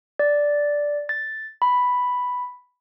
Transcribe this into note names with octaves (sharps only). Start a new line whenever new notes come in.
D5
A6
B5